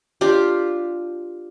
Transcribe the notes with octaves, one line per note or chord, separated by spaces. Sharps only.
D4 F4 G4